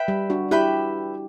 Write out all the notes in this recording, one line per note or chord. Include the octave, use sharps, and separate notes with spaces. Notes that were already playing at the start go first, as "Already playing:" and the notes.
Already playing: B4 E5 G5 B5
G3
D4 F#4
E4 G4 B4 E5 G5 B5